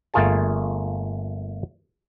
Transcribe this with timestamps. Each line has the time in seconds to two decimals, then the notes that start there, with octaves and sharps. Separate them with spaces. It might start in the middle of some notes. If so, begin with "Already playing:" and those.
0.14 G1 A3 A#3 F4 G#4 A5